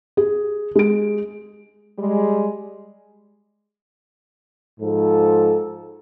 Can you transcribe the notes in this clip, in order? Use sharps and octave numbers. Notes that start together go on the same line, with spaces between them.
G#4
G#3 D7
G3 G#3
G#2 F3 A4